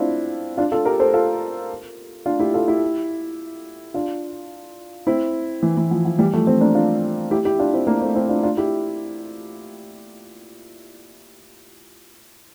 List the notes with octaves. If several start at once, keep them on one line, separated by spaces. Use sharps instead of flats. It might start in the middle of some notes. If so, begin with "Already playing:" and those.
Already playing: C4 D4 E4 F4
D4 F4
F4 A4
G4 A#4
A4 C5
F4 A4
D4 F4
E4 G4
F4 A4
E4 G4
D4 F4
C4 E4
E3
E3
F3
F3
E3 G3
F3 A3
A3 C4
A#3 D4
D4 F4
E4 G4
E4 G4
D4 F4
C4 E4
A#3 D4
A3 C4
C4 E4
D4 F4
D4 F4
E4 G4